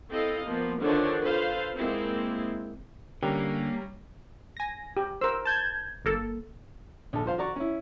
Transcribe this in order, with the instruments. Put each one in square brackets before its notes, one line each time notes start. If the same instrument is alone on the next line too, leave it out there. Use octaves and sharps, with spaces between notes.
[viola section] C4 E4 A4 D#5 F5
F3 A#3 B3
D3 D#3 F3 D4 C5 C#5
F4 A4 B4 C5 F5
G#3 A#3 C4 E4
[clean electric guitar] D3 [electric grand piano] G3 C#4 A#4 [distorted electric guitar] A#3 A#5 [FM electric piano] G4
[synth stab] G#5 A#6
[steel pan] G4
[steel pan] A#4 C5 [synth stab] E6
[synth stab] A5 G6 G#6
G1 A#3 A4
[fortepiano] A#1 A4
F3 C5 F5
F#4 D5 A#5 C#6
C#4 E4